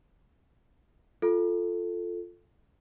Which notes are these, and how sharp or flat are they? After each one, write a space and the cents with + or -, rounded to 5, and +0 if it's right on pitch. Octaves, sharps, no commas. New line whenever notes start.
F4 +0 A4 +0